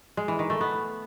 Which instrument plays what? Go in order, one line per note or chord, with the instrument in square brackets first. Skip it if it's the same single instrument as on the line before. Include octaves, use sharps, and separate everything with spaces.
[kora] G#3
E3
D#3
A3
B3